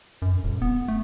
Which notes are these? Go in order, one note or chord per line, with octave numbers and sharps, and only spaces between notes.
F#2
D#1
B3
A3